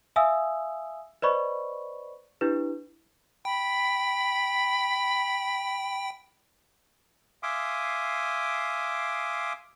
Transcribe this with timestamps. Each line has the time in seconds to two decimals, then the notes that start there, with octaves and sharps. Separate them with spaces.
0.16 E5 F5 G#5 D#6 E6
1.22 B4 C5 D5 D#5 B5 C#6
2.41 D4 E4 G4 B4
3.45 G5 B5
7.43 E5 F5 G#5 C6 D6 D#6